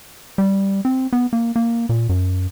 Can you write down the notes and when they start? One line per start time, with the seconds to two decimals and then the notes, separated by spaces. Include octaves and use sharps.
0.38 G3
0.85 C4
1.13 B3
1.33 A#3
1.56 A#3
1.89 A#2
2.09 F#2